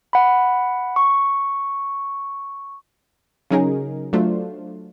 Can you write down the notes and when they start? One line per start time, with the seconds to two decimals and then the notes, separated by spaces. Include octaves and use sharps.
0.13 F#5 B5
0.96 C#6
3.51 C#3 F#3 C#4 D#4 G#4 A#4
4.13 F#3 A3 D4 F4 C5